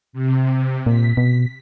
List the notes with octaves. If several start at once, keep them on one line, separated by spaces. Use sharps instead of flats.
C3
A#2 B6
B2